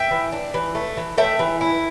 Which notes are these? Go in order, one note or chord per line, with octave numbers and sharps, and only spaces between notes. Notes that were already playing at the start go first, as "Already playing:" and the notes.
Already playing: E5 G5
E3
D4
E3
A3
E3
A3 E5 G5
E3
E4